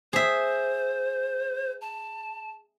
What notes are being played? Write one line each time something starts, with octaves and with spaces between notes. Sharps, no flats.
G#4 C5 E5
A5